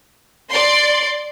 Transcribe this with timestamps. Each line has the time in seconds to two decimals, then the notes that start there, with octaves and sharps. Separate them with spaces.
0.49 D5 C6